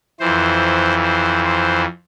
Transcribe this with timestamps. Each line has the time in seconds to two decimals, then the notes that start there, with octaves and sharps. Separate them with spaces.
0.20 F2 E3 C5
1.03 C5
1.45 C5